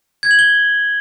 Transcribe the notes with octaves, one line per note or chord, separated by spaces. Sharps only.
G#6
F#7
G7